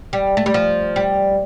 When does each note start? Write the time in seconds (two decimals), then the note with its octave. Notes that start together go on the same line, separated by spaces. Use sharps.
0.13 G3
0.37 A3
0.46 G3
0.54 F3
0.96 G3